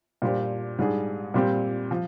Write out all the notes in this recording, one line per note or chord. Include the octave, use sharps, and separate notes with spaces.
A#2 G3 D4 G4 C5
G#2 G3 D4 G#4
A#2 G3 C4 G4
F3